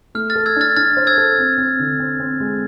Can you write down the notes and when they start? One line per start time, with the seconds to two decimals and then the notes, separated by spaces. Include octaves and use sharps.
0.15 A3 F6
0.30 F6 A6
0.35 A4
0.46 E6 G#6
0.56 D4 F6 A6
0.76 D4 F6 A6
0.97 C5
1.07 E6 G#6
1.17 A4
1.38 C4
1.58 C4
1.79 D3
2.00 C4
2.20 C4
2.40 G#3